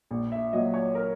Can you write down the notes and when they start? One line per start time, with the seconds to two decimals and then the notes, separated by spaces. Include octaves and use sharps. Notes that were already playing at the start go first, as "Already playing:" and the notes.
0.11 A#1
0.32 E5
0.53 A#2 F#3 D#5
0.74 C#5
0.95 A#4